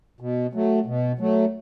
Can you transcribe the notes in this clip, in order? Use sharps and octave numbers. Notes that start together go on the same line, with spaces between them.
B2
F#3 A3
B2
F#3 A3